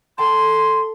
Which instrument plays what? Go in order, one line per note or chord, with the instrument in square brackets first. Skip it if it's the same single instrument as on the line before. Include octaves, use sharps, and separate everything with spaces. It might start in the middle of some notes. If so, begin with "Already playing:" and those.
[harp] A4 G5 A5 [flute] C6